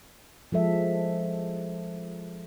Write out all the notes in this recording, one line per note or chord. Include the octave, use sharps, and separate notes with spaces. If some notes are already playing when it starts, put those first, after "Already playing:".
F3 G#3 A4 E5